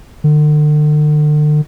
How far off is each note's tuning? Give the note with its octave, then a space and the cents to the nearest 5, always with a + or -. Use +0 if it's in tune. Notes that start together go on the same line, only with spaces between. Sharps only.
D3 +40